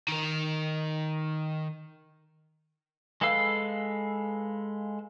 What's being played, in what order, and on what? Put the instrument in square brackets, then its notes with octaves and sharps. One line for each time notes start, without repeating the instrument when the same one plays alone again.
[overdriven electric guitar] D#3 A#4
[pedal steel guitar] G#3 A4 B4 F5 E6